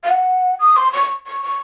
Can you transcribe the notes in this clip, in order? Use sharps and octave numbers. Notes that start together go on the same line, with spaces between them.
F5
F#5
D#6
C6
C#6
C#6
C#6